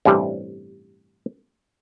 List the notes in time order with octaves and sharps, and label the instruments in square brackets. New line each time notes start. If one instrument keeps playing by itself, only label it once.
[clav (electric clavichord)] A1 G2 C3 G3 E4